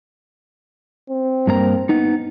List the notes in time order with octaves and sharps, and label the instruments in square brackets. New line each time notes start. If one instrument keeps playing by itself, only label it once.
[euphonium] C4
[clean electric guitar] G2 A#3 A#5
B3 D#4